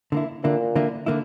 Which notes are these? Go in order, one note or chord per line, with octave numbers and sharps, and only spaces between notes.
D3 A#3 E4
A#2 D3 A#3 E4
D3 A#3 E4
D3 A#3 E4